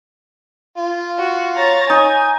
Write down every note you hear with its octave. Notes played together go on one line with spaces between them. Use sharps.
F4
F#4
C#5 A#5 A6
D#4 G#5